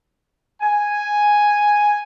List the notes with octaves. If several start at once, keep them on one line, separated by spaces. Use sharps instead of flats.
G#5